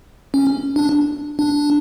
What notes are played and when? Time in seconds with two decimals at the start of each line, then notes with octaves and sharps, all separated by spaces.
0.34 C#4
0.76 D4
1.39 D4